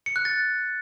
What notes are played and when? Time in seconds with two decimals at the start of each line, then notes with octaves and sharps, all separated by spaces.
0.06 C#7
0.16 F#6
0.25 A6